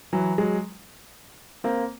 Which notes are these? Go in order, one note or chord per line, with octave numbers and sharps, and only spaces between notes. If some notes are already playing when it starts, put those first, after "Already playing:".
E3 F#3
F#3 G#3
A#3 C4